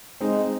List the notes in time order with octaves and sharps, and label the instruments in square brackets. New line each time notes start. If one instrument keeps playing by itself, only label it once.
[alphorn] G#3 [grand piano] C4 D#4